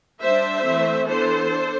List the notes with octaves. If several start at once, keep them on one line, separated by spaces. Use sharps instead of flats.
G3 D4 C5 E5
E3 A3 C4
E3 B3 D4 A4 C5
D4